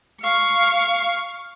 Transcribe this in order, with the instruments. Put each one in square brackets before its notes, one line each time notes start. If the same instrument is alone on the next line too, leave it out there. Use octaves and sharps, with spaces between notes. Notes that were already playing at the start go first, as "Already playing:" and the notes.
[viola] F5 C#6